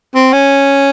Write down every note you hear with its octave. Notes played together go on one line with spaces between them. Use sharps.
C4
C#4